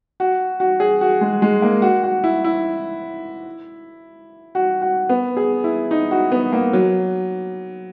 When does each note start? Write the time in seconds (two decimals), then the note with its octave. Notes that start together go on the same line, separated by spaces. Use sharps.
0.20 F#4
0.60 F#4
0.80 G#4
1.01 F#4
1.21 G#3
1.42 G#3
1.62 A#3
1.82 F#4
2.03 F#4
2.24 E4
2.44 E4
4.55 F#4
4.82 F#4
5.09 B3
5.37 G#4
5.64 E4
5.91 D#4
6.11 F#4
6.32 B3
6.53 A#3
6.73 F#3